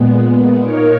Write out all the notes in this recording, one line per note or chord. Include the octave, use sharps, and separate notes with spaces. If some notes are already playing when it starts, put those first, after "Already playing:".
Already playing: A#2 G#3 B3
A#2 A#3 D#4 A#4 C#5